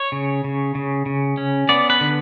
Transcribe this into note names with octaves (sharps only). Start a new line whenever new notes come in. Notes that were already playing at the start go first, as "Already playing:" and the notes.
Already playing: C#5
C#3
C#3
C#3
C#3
C#4
B3 D5
B4
D3